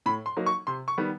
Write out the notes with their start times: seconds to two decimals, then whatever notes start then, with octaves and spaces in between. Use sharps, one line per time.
0.06 A2 B5
0.26 C6
0.37 F#3 A#3 D#4
0.46 C#6
0.67 C3 C6
0.88 C#6
0.98 D#3 G3 B3